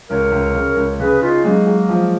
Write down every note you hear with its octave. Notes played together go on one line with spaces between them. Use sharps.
C#2 A#4 C#5
C#2
C#3
C#2
C#3 G#4 B4
C#4 D#4 F4
F#3 G#3 A#3
G#3
F3